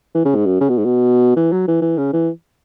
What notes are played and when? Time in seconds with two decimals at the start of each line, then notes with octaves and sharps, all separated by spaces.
0.15 E3
0.25 C#3
0.35 G#2
0.46 F#2
0.61 C#3
0.69 B2
0.78 G#2
0.85 B2
1.37 E3
1.52 F#3
1.68 E3
1.82 E3
1.98 C#3
2.13 E3